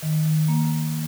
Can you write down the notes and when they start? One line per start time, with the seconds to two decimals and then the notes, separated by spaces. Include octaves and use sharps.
0.03 D#3
0.26 D#3
0.48 A#3
0.72 A#3